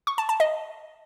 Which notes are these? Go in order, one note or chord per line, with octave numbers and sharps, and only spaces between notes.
C#6
A5
A5
D#5